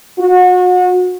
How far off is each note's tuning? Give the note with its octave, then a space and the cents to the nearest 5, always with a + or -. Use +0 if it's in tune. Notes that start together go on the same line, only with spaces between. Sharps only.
F#4 -30